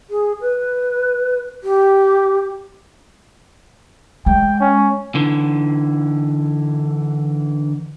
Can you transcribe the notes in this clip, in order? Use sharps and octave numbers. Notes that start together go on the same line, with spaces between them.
G#4
B4
G4
G#3 G5
C#4
D3 E3